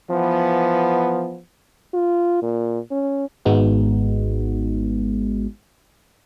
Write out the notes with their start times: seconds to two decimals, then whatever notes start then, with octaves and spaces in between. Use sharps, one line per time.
0.11 E3 F3 B3
1.94 F4
2.42 A#2
2.91 C#4
3.45 G#1 G#2 G#3 B3 D#4 F#4